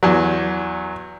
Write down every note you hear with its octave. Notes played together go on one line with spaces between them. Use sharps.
E2 F#3